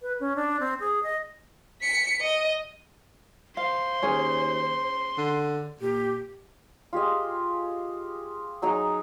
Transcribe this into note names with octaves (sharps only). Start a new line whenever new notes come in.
B4
C#4
D4
C4
G#4
D#5
B6 C#7
D#5
C5 F5 C6
D#2 C#4 G#4 C#5
D3
A#2 G4
F4 G4 G#4 D#5
F#3 D#4 G#4 A#5